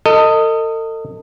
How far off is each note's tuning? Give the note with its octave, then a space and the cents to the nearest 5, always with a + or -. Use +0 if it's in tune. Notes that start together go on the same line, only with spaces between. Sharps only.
A4 +40 D#5 +0